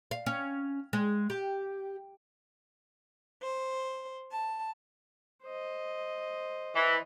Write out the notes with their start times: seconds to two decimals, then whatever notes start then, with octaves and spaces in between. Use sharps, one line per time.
0.11 F5
0.26 C#4
0.93 G#3
1.30 G4
3.43 C5
4.31 A5
5.44 C5 D#5
6.75 E3